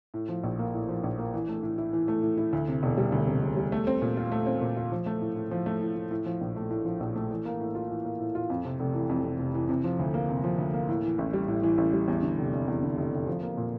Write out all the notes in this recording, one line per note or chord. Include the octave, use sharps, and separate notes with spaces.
A2
F3
A#1
A#3
A2
F3
A#1
A#3
E3
A3
A2
E4
E3
A3
A2
E4
D2
C3
E1
G3
D2
C3
E1
G3
A3
C4
A#2
F4
A3
C4
A#2
F4
F3
A3
A2
A2
F3
A3
A2
A2
A2
F3
A#1
A3
A2
F3
A#1
A3
E3
A#3
A2
F4
E3
A#3
A2
F4
F2
C3
F1
E3
F2
C3
F1
E3
C3
F3
D2
A#3
C3
F3
D2
A#3
A2
E3
A1
G3
A2
E3
A1
G3
E2
D3
F1
F1
E2
D3
F1
F1
F3
A#3
A#2